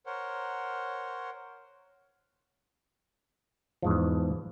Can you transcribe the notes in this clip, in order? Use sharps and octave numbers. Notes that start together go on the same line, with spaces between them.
A#4 C5 C#5 F#5
E2 G#2 F3